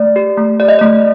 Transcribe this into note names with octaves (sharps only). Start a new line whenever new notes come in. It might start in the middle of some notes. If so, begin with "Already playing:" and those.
Already playing: A3 D5
G4
A3
G4 D5
D#5
A3 D5